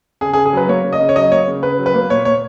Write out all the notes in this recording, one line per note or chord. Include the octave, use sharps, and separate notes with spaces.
C#3 G#4
G#4
C#3
G#4
F#3 B4
A#3 C#5
C#3
D#5
C#3
C#5
F#3 D#5
A#3 C#5
C#3
C#3 B4
F#3
B4
A#3
A#2 C#5
A#2 C#5